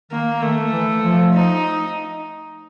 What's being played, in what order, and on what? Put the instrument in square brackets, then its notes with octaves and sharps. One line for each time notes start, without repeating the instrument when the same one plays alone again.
[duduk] D#3 [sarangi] A#3
[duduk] D#3 [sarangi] A3
[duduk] E3
F3
[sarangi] D#4